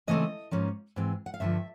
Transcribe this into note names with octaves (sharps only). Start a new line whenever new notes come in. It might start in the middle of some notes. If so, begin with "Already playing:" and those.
C#3 E3 A3 C4 D#5
G#2 F3 A#3 C#4
G#2 E3 G#3 C4
F#5
F5
G2 D3 F3 E5